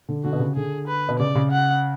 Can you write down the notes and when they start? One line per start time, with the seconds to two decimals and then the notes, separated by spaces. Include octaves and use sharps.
0.09 D3
0.24 D3 F#4
0.33 B2
0.40 C#3
0.56 D3 G#4
0.87 B4
1.09 B2
1.19 C#3 D5
1.35 C#3
1.52 F#5